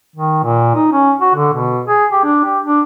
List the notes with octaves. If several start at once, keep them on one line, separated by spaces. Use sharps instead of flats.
D#3
A#2
D#4
C#4
F#4
D3
B2
G#4
G4
D4
G4
D4